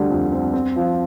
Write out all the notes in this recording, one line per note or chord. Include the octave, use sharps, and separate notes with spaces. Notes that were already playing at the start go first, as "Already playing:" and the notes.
Already playing: D2 D3 G3
F2
C4
C4
F3